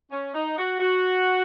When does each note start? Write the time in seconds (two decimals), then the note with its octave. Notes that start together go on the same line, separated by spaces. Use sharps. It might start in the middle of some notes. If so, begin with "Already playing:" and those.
0.10 C#4
0.34 D#4
0.57 F#4
0.80 F#4